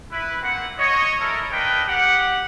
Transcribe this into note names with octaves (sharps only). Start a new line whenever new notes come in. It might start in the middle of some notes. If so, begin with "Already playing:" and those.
E4 B4
A#3 C4 F#5
C#5 D#5
E4 A4 A#4
A#3 D4 A#4 B4 D#5 G5
G4 F#5